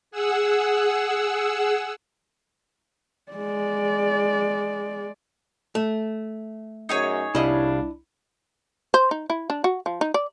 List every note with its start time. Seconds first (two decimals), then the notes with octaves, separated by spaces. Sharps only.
0.11 G#4 F#5 E6
3.32 G#3 D5
5.75 A3
6.89 F#2 D#4 G#4 C#5
7.35 C2 G3 D4 E4 D#5 F5
8.94 C5
9.11 D#4
9.30 E4
9.50 D4
9.64 F#4
9.86 F3
10.01 D#4
10.14 D5